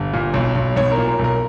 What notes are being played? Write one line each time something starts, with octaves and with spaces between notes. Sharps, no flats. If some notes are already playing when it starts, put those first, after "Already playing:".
Already playing: G1
A#2
B1
B1
B1 C#5
A#4
A#2
A#4
B1
A#4